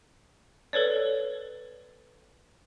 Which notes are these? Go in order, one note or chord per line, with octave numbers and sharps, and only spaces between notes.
A4 B4 C#5 D5